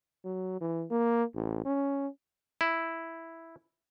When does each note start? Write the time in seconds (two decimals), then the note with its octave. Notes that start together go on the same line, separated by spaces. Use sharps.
0.25 F#3
0.61 E3
0.91 A#3
1.35 A1
1.65 C#4
2.61 E4